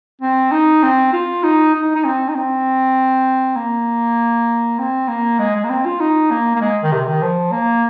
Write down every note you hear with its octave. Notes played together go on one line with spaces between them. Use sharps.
C4
D#4
C4
F4
D#4
D#4
D#4
C4
D#4
C4
A#3
C4
A#3
G#3
G#3
A#3
C4
F4
D#4
A#3
A#3
G#3
D#3
C3
D#3
F3
A#3